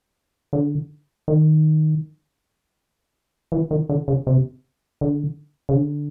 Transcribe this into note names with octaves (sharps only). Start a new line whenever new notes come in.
D3
D#3
E3
D#3
D3
C#3
C3
D3
C#3
D3